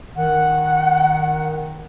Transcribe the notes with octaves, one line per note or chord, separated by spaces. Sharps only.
D#3 F#5